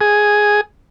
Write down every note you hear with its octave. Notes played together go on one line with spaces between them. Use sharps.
G#4